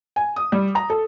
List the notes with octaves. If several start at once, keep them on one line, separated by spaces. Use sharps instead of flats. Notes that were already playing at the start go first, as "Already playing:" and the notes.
G#5
D#6
G3
A#5
A4